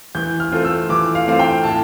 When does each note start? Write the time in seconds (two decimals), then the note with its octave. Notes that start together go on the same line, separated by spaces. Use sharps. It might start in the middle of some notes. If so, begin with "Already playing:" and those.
0.15 E3 G6
0.40 F6
0.52 A3 C4 F4
0.65 E6
0.89 E3 D6
1.15 F5
1.27 A3 C4 F4 F5
1.39 G5
1.64 A2 A5